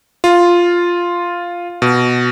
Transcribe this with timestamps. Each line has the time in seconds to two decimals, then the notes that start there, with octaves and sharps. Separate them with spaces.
0.24 F4
1.82 B2